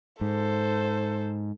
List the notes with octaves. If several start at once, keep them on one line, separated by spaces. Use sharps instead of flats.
G#2 A4 C5